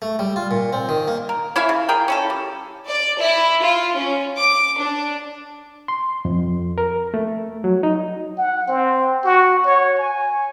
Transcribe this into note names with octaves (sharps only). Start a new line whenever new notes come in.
A3
G3
F4
A#2
C4
D#3
A#3
A#4
C#4 E4 E5 F5
C#3
G#4 A#4 G5
C#4 E4 A4
G3
D5
E4
F4
C#4
D6
D4
C6
F2
A#4
A3
F#3
D#4
F#5
C4
F#4
C#5
G#5